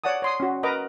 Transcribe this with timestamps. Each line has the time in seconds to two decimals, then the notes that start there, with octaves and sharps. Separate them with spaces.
0.04 C#5 D5 F#5 A5 D#6
0.22 C#5 C6 D#6
0.40 C#4 F#4
0.63 A#4 B4 D#5 A#5 D6